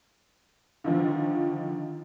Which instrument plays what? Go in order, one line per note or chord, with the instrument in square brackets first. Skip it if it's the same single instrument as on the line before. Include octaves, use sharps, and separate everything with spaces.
[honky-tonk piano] D3 D#3 F3